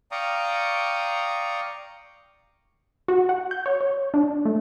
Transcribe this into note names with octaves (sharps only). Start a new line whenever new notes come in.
D5 F5 G5 A#5 C#6 D#6
F#4
F#5
G6
C#5
C#5
D4
A3